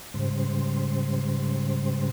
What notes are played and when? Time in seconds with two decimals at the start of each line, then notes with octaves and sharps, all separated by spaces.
0.14 G#2 C#3 G3 C5